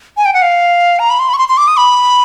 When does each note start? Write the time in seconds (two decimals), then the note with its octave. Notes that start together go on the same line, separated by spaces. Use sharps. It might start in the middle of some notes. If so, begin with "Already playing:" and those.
0.17 G#5
0.25 G5
0.34 F#5
0.42 F5
0.99 A#5
1.10 B5
1.19 C6
1.29 B5
1.34 C#6
1.38 C6
1.49 C6
1.57 D6
1.68 D#6
1.77 B5